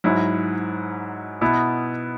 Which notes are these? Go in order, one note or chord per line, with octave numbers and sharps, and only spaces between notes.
G#2 F#3 E4
B2 B3 E4